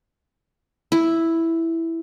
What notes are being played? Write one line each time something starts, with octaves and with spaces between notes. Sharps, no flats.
E4